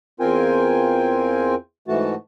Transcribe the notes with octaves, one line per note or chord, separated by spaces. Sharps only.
E2 C4 F4 A#4 G5 G#5
G#2 E3 A3 F#4 A5